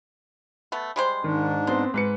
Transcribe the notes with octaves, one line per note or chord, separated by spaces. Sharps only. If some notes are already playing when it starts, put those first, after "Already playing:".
A3 B3
G3 G#3 C5
G#2 D#3 D4
B3 C4 C5
G#2 B4 C#7